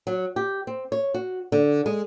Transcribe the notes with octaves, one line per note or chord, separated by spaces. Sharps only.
F#3
G4
C4
C#5
F#4
D3
G#3